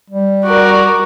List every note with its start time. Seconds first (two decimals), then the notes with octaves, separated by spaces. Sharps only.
0.10 G3
0.45 F#4 A#4 D5